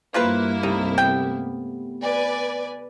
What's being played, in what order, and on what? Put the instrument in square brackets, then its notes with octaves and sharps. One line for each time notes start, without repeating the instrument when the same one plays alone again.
[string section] G2 A#3 E4 [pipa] F3 F4 B4
[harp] C2 A3 [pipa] D#4
[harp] B3 [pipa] G5
[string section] B4 D5 G#5